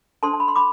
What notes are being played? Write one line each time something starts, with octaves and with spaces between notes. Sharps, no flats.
D4 A4 C5 A5 C6
A5
B5
C6
B5 D6